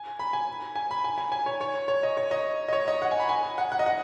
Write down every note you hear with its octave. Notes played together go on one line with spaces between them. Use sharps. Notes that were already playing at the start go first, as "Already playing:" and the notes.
Already playing: G#5
B5
G#5
G#5
B5
G#5
G#5
G#5
C#5
C#5
C#5
D#5
C#5
D#5
D#5
C#5
D#5
F#5
G#5
B5
G#5
F#5
F#5
D#5
F#5